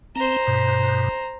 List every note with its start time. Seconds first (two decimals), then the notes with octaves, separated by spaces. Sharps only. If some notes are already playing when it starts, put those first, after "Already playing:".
0.15 C4 C5 A#5
0.47 G2 B2